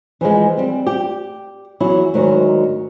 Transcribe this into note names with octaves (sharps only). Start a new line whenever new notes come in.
E3 F3 G3 G#3
G3 C4
G4
E2 F#3 E4
D2 G#2 D#3 F#3